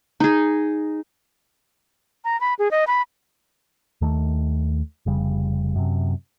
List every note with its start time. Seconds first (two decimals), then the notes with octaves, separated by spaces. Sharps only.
0.20 D#4 G#4
2.25 A#5
2.41 B5
2.59 G#4
2.71 D#5
2.87 B5
4.01 D#2 D#3 A3
5.06 F1 C#3 G3
5.76 F#2 C3